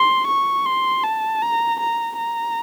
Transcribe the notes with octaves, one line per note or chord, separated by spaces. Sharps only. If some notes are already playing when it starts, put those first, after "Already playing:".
Already playing: C6
C#6
C6
A5
A#5
A#5
A#5